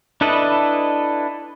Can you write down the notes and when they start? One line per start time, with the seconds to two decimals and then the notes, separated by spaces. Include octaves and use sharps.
0.21 D4 E4 A4 B4 D#5